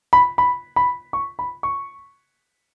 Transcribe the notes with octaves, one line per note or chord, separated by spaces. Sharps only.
B5
B5
B5
C#6
B5
C#6